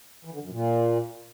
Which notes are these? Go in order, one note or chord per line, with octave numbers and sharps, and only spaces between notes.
E3
D3
F#2
A#2